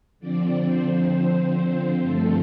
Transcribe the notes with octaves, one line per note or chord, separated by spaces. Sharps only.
D3 F3 C4 D5
C5
G2 D3 F3 A3 C4 A4